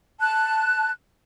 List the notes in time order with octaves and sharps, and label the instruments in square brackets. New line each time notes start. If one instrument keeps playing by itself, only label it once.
[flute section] A5 F#6